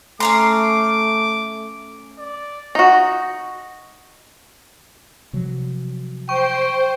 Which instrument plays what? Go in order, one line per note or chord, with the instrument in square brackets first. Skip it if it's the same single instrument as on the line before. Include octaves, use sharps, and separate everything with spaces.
[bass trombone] A3 [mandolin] C#4 A#5 C6 [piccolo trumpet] D6
[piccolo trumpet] D5
[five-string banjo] D#4 F#4
[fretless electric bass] C3 F3 F#3
[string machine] C5 [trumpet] G5 [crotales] C#6